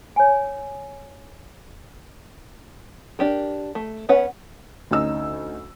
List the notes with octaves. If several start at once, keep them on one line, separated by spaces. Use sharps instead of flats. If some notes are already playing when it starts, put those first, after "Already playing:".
C#5 G#5
D4 G4 A#4
A3
B3 C#4 B4 C#5 F#5
D2 C#4 D#4 E6